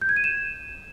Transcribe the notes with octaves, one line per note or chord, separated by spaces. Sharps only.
G6
G#6
D#7
E7